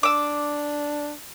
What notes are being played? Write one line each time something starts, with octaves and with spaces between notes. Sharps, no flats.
D4 D6 E6